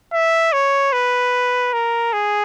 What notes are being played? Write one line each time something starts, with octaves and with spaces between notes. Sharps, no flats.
E5
C#5
B4
A#4
G#4